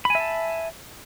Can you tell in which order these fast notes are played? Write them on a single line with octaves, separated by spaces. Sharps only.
B5 G#5 E5 A5